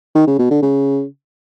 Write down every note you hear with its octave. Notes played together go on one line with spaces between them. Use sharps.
D#3
C#3
B2
D3
C#3